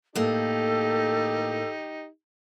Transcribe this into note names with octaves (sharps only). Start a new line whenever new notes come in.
A2 A#3 D#4 G4 A4